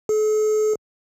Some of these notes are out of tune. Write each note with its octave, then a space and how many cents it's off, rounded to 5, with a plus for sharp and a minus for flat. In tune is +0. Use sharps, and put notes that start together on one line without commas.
A4 -45